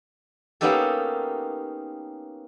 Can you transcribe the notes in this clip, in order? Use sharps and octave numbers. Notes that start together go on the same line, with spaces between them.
A#3 B3 C#4 D#4 G4 A4